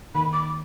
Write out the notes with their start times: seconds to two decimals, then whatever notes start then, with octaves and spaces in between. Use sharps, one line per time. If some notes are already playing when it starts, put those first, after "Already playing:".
0.15 D#3 B5
0.33 D6